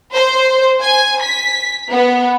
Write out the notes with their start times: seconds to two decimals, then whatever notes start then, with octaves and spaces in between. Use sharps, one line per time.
0.14 C5
0.82 G#5
1.22 B6
1.91 B3